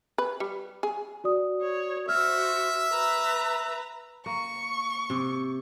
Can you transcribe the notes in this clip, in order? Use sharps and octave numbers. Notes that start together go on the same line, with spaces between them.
B4
G3
G#4
F#4 D5 D#6
C#5
F#4 C5 E5 F6
B4 A#5
A#3 C#6
C3